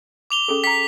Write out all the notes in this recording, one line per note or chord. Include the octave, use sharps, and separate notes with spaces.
D6 F7 G7
C#4 G#4 A4
G5 A#5 B6